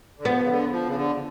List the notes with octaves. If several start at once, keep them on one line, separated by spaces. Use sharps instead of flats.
D3
F3 B3
C#3
D3
F3
C#3
D3